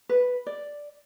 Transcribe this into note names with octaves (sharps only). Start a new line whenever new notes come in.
B4
D5